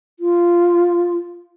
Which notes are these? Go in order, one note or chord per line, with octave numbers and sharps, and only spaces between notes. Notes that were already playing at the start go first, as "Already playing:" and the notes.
F4